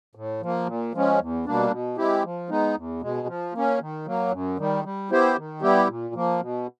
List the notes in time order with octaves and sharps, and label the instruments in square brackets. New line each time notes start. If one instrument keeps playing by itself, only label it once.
[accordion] A2
F3 A#3
A#2
F3 G#3 C#4
E2
B2 G3 A#3 D4
B2
G#3 C4 E4 G4
F3
G#3 B3 D#4
E2
B2 G#3
F3
A#3 C#4
D#3
F#3 A#3
F#2
D#3 G3
G3
B3 E4 G4 C5
D#3
G3 B3 E4 G4
A#2
F3 A#3
B2